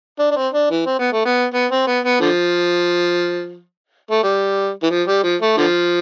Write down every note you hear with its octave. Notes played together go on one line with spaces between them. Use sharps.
D4
D4
C4
D4
E3
C4
B3
A3
B3
B3
C4
B3
B3
D3 F3
A3
G3
E3
F3
G3
F3
A3
D3 F3